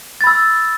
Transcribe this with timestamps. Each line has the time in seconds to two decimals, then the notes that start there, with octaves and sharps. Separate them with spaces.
0.21 A6
0.24 B5
0.27 E6